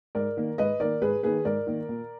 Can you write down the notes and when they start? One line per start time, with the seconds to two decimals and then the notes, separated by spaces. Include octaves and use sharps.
0.15 G#2 A#4 D5
0.37 D#3 A#3
0.58 G#2 B4 D#5
0.80 D#3 A#3 A#4 D5
1.02 G#2 G#4 B4
1.23 D#3 A#3 G#4 B4
1.45 G#2 A#4 D5
1.67 D#3 A#3
1.89 A#2